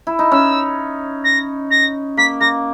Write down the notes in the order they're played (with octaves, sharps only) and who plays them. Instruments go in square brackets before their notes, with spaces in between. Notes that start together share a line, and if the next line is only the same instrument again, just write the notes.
[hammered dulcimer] E4
D#4
[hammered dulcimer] C#4 [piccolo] E6
[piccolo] A#6
A#6
[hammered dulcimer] A#3 [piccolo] B6
[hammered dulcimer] A#3 [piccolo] A#6